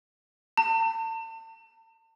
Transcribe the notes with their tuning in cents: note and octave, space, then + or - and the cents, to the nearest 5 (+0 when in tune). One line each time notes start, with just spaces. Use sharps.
A5 +40